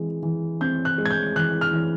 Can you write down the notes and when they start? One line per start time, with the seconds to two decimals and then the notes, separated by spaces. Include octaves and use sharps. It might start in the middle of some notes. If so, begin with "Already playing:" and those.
Already playing: E3 G#3 C4
0.23 E3
0.61 C4 G6
0.85 F#6
0.98 G#3
1.05 G#6
1.10 G6
1.36 E3 F#6
1.61 F6
1.73 E3